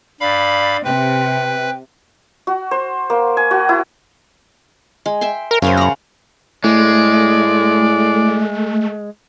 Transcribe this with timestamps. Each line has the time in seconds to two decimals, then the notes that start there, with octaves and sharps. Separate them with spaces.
0.21 G2 D5 F5 B5
0.85 C3 B4 G5
2.47 F#4
2.71 C5
3.10 A#3
3.37 G#5
3.51 F#4
3.69 E4
5.06 G#3
5.21 E5 G5 C6
5.51 A#4
5.62 F#2 C#3 A#4 C5
5.77 F#5 A#5
6.64 A2 G#3 A3 D5